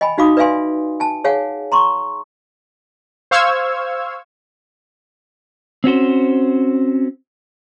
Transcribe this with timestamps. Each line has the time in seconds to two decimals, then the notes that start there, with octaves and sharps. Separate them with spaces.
0.01 D#5 G5 G#5 B5
0.18 D#4 F#4 F5 B5 D6 D#6
0.37 B4 D5 E5 F5 G#5 C6
1.00 G#5 A5
1.24 G#4 C#5 F5 F#5 G#5
1.72 A#5 C6 C#6
3.31 C5 F5 C#6 E6 F6 G#6
5.84 C4 C#4 F#4 C5